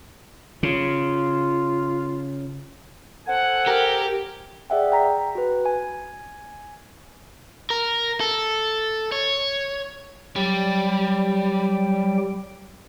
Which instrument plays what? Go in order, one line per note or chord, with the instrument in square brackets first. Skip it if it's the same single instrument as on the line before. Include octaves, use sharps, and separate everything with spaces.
[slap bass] C#3 [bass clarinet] F4
[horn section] A4 C5 G#5 [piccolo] F#5
[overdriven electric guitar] G4 [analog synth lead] A#4
[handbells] G#4 D5 E5 F#5 G5
G5 A#5 B6
F#4 B4
G#5
[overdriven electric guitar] A#4
A4
C#5
[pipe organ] F#3 G4 G5 [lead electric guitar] G3